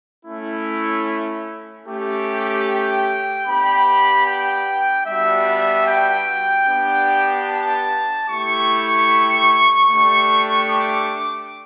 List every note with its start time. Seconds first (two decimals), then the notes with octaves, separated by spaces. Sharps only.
0.24 A3 C#4 E4
1.85 A3 C#4 G4
2.65 G5
3.46 B3 D4 G4 B5
4.26 G5
5.06 G3 B3 D4 F#4 E5
5.88 G5
6.67 B3 D4 G4
7.48 A5
8.28 A3 E4 G4 C#6
9.90 A3 D4 G4
10.70 D6